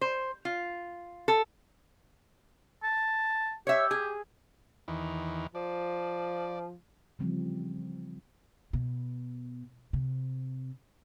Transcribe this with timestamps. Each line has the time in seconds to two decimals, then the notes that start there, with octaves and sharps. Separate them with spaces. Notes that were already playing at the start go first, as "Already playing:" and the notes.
0.01 C5
0.45 F4
1.28 A4
2.83 A5
3.67 G4 C#5 E5
3.91 G#4
4.88 E2 D#3 E3
5.55 F3 D5
7.19 C#3 E3 F3 G3 C4
8.73 B2
9.93 C3